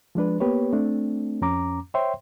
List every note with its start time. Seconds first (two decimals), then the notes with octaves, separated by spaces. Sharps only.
0.15 F3 G#3 D4 B4
0.40 A#3 B3 G4 B4 C#5
0.73 A3 C4 D4
1.42 F2 C#4 A#5 D6
1.94 C5 C#5 E5 G5 C6